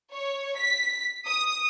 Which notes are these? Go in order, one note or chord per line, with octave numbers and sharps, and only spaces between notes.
C#5
B6
D#6